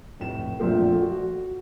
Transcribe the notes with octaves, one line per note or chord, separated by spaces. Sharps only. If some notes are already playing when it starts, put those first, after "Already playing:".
F1 A2 E7
A#1 F2 A#2 F3 A3
F#4